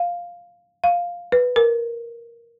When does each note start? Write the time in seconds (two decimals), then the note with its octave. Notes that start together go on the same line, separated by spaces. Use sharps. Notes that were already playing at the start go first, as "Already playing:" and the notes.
Already playing: F5
0.84 F5
1.32 B4
1.56 A#4